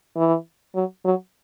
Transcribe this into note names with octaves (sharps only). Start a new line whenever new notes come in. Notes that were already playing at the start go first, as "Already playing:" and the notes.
E3
F#3
F#3